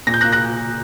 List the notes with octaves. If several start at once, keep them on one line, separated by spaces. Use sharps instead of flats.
A#2 A#6
G6
A#3 F#6 A#6
F#6 A#6